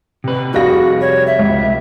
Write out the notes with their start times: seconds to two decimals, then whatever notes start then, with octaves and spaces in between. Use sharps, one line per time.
0.24 C3 B4
0.53 F1 G3 F#4 G#4 F5 A#6
1.01 C#5
1.27 E5
1.39 C#2